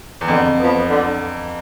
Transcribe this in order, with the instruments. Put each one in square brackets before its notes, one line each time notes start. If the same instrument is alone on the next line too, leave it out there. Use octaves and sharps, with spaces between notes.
[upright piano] E2
[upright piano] F2 [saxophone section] D3
[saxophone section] F3 B3
D3